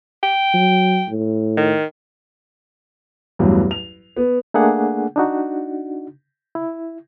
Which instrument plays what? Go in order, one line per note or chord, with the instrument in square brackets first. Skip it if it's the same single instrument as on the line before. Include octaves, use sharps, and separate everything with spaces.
[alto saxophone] G5
[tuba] F#3
A2
[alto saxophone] D#3
[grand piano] A1 E2 G2 F#3
F7
B3
[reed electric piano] A3 A#3 D4 G#4 F#5
D4 D#4 F#4
E4